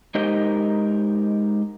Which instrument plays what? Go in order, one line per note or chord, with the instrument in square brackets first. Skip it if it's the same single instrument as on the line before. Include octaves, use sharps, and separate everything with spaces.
[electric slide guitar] G#3 D#4 G4 A#4 C5 D#5